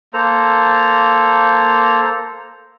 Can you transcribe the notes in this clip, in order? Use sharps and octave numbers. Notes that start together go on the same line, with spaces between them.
A#3 A4 C5 A#5